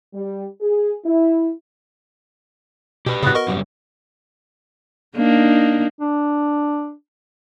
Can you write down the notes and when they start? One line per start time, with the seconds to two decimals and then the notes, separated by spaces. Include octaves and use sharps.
0.14 G3
0.61 G#4
1.05 E4
3.06 B2 G4 B4
3.23 A2 C#3 B3 F#4
3.35 A#4 D#5 C#6
3.48 F#2 C#3 G3
5.17 A#3 D4 D#4
6.00 D4